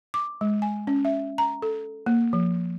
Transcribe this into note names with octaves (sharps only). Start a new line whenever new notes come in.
D6
G#3
G#5
C#4
E5
A#5
A4
A#3
F3